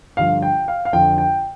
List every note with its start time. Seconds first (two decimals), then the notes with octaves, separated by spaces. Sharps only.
0.17 G2 D3 F3 F5
0.42 G5
0.68 F5
0.85 F5
0.93 F2 D3 F3 G5
1.18 G5